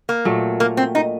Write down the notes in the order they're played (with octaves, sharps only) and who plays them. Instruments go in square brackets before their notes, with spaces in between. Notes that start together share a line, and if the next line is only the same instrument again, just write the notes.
[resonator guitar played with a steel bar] A#3
[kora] A#2 F#3 A3
[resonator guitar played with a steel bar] A#3
C4
D#4